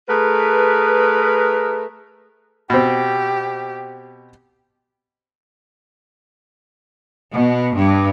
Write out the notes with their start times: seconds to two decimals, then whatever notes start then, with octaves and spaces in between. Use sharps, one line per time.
0.09 A3 G#4 A#4 B4
2.70 B2 C4 G4
7.32 B2
7.75 G2